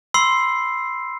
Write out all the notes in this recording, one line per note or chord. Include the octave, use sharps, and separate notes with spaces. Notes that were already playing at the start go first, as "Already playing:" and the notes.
B5 C6 E6 C7